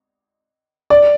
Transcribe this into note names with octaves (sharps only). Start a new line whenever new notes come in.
D5